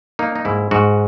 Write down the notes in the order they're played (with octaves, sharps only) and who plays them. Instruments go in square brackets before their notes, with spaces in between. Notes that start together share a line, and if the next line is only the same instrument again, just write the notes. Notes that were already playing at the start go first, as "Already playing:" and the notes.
[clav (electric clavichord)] A#3 D#4
D#4
G#2 E4
G#2 F#4